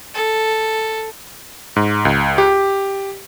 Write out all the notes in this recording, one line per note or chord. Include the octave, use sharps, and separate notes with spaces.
A4
G#2
C#2
G4